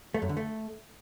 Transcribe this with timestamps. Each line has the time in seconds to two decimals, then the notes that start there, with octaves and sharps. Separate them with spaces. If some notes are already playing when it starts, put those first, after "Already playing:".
0.14 A3
0.22 F#2
0.29 D3
0.37 A3